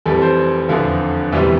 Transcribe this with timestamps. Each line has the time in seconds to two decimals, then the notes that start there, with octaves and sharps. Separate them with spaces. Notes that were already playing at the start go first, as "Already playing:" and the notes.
0.06 F1 F2 E3 G3 A4
0.22 C5
0.69 F1 E2 D3 F3 E5
1.33 E1 D2 C3 E3 G3 E5